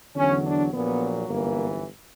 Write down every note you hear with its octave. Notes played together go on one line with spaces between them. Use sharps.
E2 D3 F#3 C#4
D4
A#1 A#2 F#3 B3
G1 F#2 E3 A#3